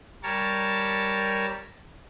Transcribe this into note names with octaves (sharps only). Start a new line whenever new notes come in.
G3 A#4 C#5 A5